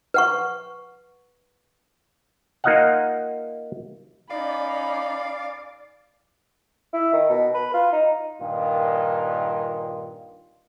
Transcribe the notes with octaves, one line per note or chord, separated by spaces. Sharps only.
B4 F#5 C#6
A#3 D#4 F4 D#5 F5 F#5
C#4 D#4 D5 F5 B5
E4
D#3
B2
B4
F4
D#4
G2 A#2 D#3 F4